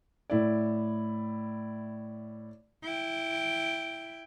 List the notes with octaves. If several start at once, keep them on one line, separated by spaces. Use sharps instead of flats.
A2 E4 D5
E4 G5